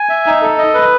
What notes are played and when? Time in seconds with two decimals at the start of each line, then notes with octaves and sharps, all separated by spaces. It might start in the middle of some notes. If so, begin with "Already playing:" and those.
Already playing: G#5
0.09 E5
0.26 D#4
0.42 A4
0.58 D#5
0.74 B4